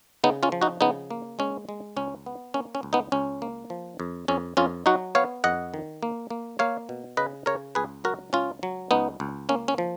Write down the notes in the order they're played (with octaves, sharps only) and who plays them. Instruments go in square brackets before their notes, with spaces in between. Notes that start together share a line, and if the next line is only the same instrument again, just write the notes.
[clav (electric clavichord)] C#3 B3 D#4
C#4 F4
F3
D#4 F#4
C#3 B3 D#4
A#3
G#3 C#4
G#3
C#2 C#4
B3
A#3 C#4
C#4
C#2
B3 D#4
C#2 C#4
A#3
F3
F2
F2 C#4
F2 C#4 F4
F#3 D#4 F#4
B3 C#5 F5
F2 D#5 F#5
D#3
A#3
A#3
A#3 C#5 F5
B2
C#3 B4 D#5
C#3 A#4 C#5
C#2 G#4 B4
F#3 F#4 A#4
C#2 C#4 F4
F#3
C#2 B3 D#4
C#2
A#3 C#4
C#4
F3